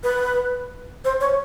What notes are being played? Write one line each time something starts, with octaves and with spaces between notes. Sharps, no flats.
B4
C5
C#5